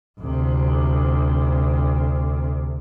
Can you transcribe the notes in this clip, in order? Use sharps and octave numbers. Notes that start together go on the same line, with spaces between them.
D2 C3